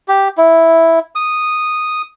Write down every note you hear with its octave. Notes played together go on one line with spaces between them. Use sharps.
G4
E4
D#6